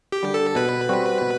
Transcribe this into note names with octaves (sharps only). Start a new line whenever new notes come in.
G4
D3 G3
A4
B2 B4
G3 C4 F#4
B2